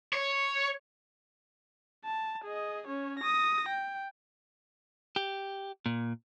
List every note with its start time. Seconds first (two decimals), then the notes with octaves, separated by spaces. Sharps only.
0.13 C#5
2.05 A5
2.44 G#4 D#5
2.87 C#4 C#5
3.19 D#6 A#6
3.68 G5
5.16 G4
5.86 A#2